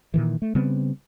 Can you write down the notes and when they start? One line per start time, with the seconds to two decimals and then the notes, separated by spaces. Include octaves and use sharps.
0.14 A#2 D#3 E3
0.42 A3
0.55 C#3 G3 B3 C4